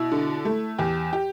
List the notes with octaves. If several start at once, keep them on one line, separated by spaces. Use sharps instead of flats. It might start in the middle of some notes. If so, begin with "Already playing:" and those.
Already playing: B2 E4
D3
A3
E2 G4
G4